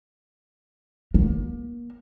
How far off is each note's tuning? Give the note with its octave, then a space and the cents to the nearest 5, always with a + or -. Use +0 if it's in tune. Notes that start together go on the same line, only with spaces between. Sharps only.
A#3 +35